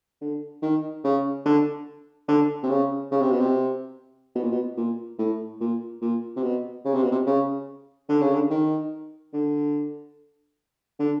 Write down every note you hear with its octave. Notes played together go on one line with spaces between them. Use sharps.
D3
D#3
C#3
D3
D3
C3
C#3
C#3
C3
B2
C3
B2
A#2
B2
A#2
A2
A#2
A#2
C3
B2
C#3
C3
B2
C3
C#3
D3
C#3
D3
D#3
D3
D3